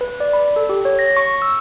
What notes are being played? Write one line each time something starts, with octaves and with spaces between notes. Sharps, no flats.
B4
D5
B5
A4
G4
C#5
A#6
C#6
E6